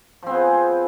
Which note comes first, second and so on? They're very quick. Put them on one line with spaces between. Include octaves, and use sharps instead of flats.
F3 C4 B3 G#4